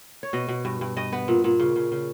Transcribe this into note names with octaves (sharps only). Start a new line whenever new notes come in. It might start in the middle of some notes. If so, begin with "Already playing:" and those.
C#5
B2 D#5
B2
G2
G2
G2 D#5
B3
A#2
A#2
C#3
C#3
C#3